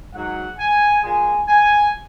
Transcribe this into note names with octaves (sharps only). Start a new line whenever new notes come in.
G#2 F#3 F#5
G#5
A#2 G#3 G#5
G#5